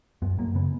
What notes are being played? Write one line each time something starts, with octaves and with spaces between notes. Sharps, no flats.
F#2 B3
F#2 A#3
C#3 B3